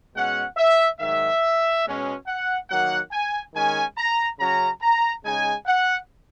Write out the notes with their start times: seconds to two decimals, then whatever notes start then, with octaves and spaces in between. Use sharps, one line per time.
0.15 B2 G#3 C#4 F#5
0.57 E5
1.00 G#2 D#3 F#3 E5
1.84 B2 G#3 C#4
2.27 F#5
2.69 D#3 F#3 A#3 F#5
3.11 G#5
3.54 D#3 G#3 C#4 G#5
3.96 A#5
4.38 C#3 F#3 C#4 A#5
4.81 A#5
5.23 C#3 G#3 D#4 G#5
5.66 F#5